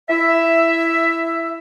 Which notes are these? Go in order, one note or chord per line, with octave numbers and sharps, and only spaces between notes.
E4 E5